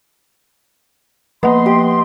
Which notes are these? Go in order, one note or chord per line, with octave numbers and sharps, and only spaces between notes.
F3 A#3 B3 D#5 C6
G4